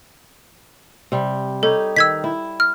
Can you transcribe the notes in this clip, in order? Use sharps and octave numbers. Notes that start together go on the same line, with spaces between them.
C3 G3
D#4 G4 A4 C#5
D#3 E6 G#6 B6
E4
F6